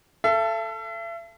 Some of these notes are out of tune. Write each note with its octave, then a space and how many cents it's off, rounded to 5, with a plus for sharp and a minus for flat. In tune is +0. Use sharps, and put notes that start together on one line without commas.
A4 +0 E5 +40 A5 +0